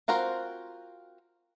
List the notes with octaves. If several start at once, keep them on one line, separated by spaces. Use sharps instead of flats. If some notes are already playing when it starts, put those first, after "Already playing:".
C4 F4 F#4 A#4 C5